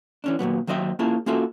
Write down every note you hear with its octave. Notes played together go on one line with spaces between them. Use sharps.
E3 C#4 D4
D#2 A#2 F#3 B3
D#2 F#3 C5 D#5 E5 G5
A#3 C#4 E4 F4 G#4 A5
A#3 C#4 F4 F#4 A4 E5